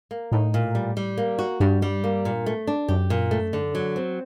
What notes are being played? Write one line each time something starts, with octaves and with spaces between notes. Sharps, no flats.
A#3
A2 D#4
A#2
G3
G3
A#3
F#4
G2 G3
G3
A#3
A#2
A3
D4
F#2 G4
A#2
A3
D3
F#3
C4